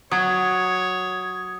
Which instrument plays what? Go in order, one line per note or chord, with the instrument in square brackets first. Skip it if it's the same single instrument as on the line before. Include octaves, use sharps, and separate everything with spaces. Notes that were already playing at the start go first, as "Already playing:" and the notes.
[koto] F#3 [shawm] C#5 [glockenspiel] D#6 G#6